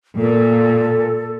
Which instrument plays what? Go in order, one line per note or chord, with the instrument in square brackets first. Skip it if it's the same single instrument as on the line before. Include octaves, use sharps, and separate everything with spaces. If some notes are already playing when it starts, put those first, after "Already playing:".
[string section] A#2 [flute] A4